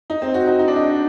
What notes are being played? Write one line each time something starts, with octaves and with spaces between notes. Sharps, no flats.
D#4
C4
F#4
D#4
D#4
D4
D#4